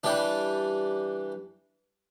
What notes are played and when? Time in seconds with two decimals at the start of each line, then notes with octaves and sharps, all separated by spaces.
0.04 E3 G3 D4 G4